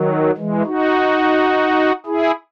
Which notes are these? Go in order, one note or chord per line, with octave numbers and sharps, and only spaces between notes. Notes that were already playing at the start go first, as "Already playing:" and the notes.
Already playing: D#3 F#3
E3 G#3
D#4 F#4
E4 G#4